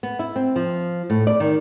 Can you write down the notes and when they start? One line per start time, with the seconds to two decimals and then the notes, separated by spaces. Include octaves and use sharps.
0.03 B3
0.19 E4
0.36 C4
0.56 F3
1.10 A2
1.27 D5
1.40 D#3